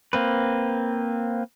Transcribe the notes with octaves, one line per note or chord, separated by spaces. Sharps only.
A#3 C4 B4